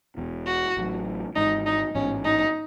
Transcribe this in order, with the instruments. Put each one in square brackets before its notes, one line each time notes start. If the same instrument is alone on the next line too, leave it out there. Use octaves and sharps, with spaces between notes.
[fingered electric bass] E1 E2 B2
[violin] F#4
[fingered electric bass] A1 A2 F#3
[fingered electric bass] G#1 G#2 E3 G#3 [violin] D#4
[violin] D#4
[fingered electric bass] A1 G#2 E3 B3 [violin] C#4
[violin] D#4